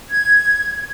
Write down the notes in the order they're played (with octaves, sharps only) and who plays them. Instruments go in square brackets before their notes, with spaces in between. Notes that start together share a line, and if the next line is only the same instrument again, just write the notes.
[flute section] G#6